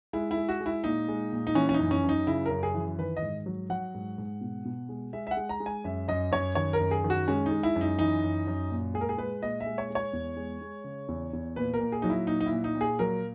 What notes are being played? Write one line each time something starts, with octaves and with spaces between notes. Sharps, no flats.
G#3 E4
E4
G#3
F#4
G#3
E4
A#2 D#4
G#3
A#2
D#4
E3 C#4
C#4
D#4
F#2
C#4
F#2
D#4
C#3 E4
A#4
F#2
G#4
E3
D#3 B4
D#5
G#2
F#3
F#3 F#5
G#2
G#2
B2
B2
G#3
G#3 E5
E5
F#5
G#3
A#5
G#3
G#5
F#2 E5
F#2 D#5
F#2 C#5
D#3 C#5
A#4
F#2
G#4
D#3
F#4
G#3 C#4
D#4
G#3
E4
F#2
D#4
E3 D#4
F#2
F#2
A#2
G#3 G#4
A#4
G#4
G#3 B4
A#2 D#5
E5
G#3
C#5
G#3
C#5
E2
G#3
G#3
C#3
E2
E2
A#2 B4
A#4
A#2
G#4
F#3 D#4
E4
A#2 D#4
D#4
E4
A#2
D#4
A#2
G#4
F#3 A#4